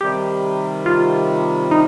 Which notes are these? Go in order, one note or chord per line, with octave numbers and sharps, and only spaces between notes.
C3 D#3 G3 G4
F4
D#4